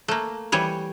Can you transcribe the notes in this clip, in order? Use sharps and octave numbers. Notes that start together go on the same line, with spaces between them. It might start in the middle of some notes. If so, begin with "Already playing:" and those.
A3 A#3
E3 G3 C#5